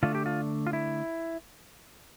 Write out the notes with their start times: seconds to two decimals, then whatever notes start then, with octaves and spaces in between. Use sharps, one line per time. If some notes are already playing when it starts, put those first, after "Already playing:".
0.03 D3 A3 D4 F4
0.15 G4
0.26 F4
0.67 F4
0.73 E4